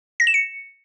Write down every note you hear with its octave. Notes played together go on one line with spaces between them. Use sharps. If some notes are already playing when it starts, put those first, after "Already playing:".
A#6
E7
C#7